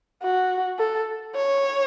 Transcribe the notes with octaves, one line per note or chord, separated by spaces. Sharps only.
F#4
A4
C#5